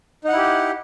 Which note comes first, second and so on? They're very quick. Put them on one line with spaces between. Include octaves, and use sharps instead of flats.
D#4 F#5 E4 G4